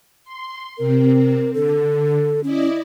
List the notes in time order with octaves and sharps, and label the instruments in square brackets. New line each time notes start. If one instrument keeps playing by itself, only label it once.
[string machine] C6
[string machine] C3 C4 [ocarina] A#4
[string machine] D3 [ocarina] A4
[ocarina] C#4 [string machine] E4 D5 D#5